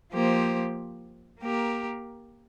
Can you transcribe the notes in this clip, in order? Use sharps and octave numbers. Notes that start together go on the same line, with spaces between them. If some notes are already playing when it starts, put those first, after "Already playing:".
F3 A#3 G4 C5
A#3 G4 A#4